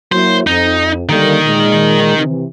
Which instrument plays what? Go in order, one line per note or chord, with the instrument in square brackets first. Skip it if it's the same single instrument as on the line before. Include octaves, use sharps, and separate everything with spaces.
[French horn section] F#3 A#3 E4 [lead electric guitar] C5
[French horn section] F2 [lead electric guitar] D#4
[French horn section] D3 G3 A#3 [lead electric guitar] D#3 D#4
[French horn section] A#2 G#3
C3 E3